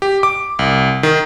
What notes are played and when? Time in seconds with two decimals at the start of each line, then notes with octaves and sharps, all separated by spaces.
0.02 G4
0.23 D6
0.59 C2
1.03 D#3